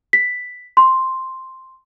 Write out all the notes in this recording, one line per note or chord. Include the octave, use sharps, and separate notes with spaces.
B6
C6